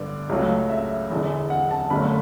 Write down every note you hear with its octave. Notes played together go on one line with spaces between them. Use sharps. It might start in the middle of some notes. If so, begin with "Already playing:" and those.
Already playing: G2 D3 B3 D5
C#2 C#3 F#3 A3
E5
E1 E2 D3
F#5
A5
G1 F#2 D3 A3 B5